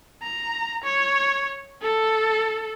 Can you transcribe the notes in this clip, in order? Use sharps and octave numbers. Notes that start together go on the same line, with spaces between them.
A#5
C#5
A4